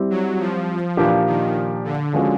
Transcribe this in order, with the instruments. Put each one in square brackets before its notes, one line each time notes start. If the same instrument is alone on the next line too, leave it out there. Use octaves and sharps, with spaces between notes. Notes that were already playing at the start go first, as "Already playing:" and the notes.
Already playing: [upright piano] G3 C4 E4 G4
[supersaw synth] F#3
F3
[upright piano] A#2 F3 A#3 D4 G4 [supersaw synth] E3
[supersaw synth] D#3
D3
[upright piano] F3 G#3 C#4 F#4